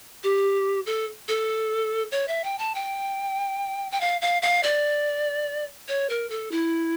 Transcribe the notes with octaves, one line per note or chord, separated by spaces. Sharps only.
G4
A4
A4
C#5
E5
G5
A5
G5
G5
F5
F5
F5
D5
C#5
A#4
A4
E4